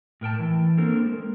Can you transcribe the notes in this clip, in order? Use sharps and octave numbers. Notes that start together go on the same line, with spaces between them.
A2 A#4 G5 A5
E3
A#3 C4 D4 A4 A#4 C5
G#3